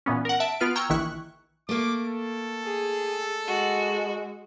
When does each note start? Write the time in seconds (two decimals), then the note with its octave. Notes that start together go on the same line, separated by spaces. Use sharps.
0.06 A#2 E3 B3 C#4
0.25 A#4 F#5
0.40 E5 A5 D7
0.60 B3 F4 B4 F6 D7
0.76 G5 A#5 C#6 E6 F6 G#6
0.90 A#1 D#3 E3 E4 C#6 F#6
1.69 A3 A#3 D6
2.04 A4
2.64 G#4
3.47 G#3 F#4